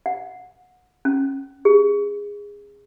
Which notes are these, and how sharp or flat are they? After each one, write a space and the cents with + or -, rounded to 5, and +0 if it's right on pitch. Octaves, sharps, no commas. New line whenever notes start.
F#5 -20
C#4 -30
G#4 -20